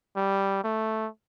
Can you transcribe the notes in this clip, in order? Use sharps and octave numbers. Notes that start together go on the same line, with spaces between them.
G3
A3